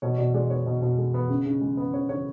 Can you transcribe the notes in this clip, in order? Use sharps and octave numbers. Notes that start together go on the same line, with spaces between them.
B2 C#5
B2 D5
G#3 D5
B3 C#5
B2
B2
G#3
B3
C#3
C#3
G#3
B3
C#3 C#5
C#3 C#5